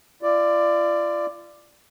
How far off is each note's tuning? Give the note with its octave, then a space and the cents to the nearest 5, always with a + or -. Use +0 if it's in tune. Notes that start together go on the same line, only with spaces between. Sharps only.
F4 -40 D5 +10